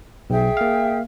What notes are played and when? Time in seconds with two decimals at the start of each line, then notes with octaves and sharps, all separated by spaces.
0.30 B1 G#4 E5 G5
0.57 A#3 F5